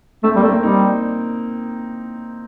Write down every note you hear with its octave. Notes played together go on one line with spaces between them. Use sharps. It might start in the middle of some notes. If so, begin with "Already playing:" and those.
A3 C4
G3 A#3
A3
C4
G3 D#4